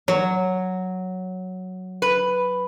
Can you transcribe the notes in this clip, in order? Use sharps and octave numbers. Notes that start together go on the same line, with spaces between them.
F#3 C#5
B4